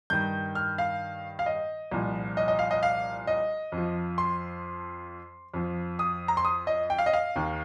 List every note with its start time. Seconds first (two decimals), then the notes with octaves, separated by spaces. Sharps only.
0.10 G2 D#3 G6
0.55 F6
0.78 F5
1.39 F5
1.46 D#5
1.92 C2 A#2 F3
2.37 D#5
2.48 D#5
2.59 F5
2.71 D#5
2.83 F5
3.27 D#5
3.72 F2
3.78 F3
4.18 C6
5.54 F2 F3
5.99 D#6
6.28 A#5
6.37 C6
6.45 D#6
6.67 D#5
6.90 G5
6.98 F5
7.06 D#5
7.13 F5
7.36 D#2 D#3